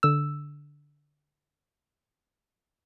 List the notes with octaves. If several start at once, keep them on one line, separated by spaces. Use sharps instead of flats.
D3 E6